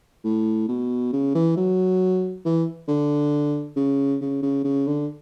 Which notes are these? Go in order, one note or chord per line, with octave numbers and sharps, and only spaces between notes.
A2
B2
C#3
E3
F#3
E3
D3
C#3
C#3
C#3
C#3
D3